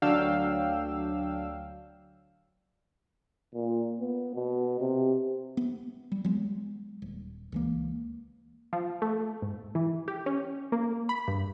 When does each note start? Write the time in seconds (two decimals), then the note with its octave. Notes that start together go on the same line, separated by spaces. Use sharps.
0.02 D2 F#3 D4 F5 G5 E6
3.54 A#2
4.00 B3
4.35 B2
4.80 C3
5.57 B3
6.12 G3
6.25 F#3 G#3 B3
7.02 D#1
7.52 C#2 E3 A#3
8.73 F3
9.02 A3
9.42 G#2
9.75 E3
10.08 G4
10.26 C#4
10.72 A#3
11.09 B5
11.28 G2